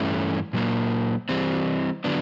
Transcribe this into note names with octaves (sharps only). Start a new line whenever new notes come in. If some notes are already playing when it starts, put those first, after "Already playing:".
Already playing: G2 E3 A3 C#4
A#2 F#3 A#3
E3 G3 C4
D3 F#3 B3 D4